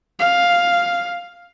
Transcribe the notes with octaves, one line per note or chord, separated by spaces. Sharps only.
F5